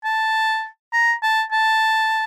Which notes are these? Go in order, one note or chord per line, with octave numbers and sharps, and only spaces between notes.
A5
A#5
A5
A5